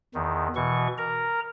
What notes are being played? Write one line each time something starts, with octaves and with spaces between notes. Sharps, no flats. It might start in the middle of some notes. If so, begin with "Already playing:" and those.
E2 D#3
B2 E3 C#6
A#4 A#5